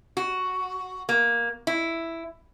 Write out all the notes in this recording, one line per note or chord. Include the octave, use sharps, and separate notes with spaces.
F#4
A#3
E4